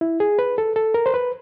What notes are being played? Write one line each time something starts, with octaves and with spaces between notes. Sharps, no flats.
E4
G#4
B4
A4
A4
A#4
C5
B4